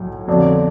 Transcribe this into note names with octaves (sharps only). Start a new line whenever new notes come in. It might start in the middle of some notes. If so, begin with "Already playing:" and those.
Already playing: B1 A2 F#3
F2 D3 F#3 B3 D4